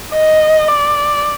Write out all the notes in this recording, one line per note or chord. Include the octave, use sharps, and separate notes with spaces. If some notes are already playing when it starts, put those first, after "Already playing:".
D#5
D5